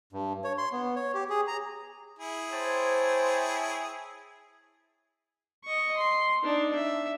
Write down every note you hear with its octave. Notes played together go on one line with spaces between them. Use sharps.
G2
C#5
C6
B3
C#5
G4
G#4
A#5
E4 G#4
C5 C#5 G5 A5
D#5 C#6
C6
D4 D#4
E5